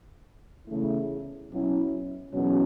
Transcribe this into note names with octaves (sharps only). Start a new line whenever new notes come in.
E2 C#3 A3 E4
B2 F#3 C#4 E4
E2 B2 F#3 C#4